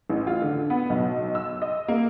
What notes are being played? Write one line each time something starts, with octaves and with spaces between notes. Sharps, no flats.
A1
F4
D3
B3
B1
E6
D#5
A#3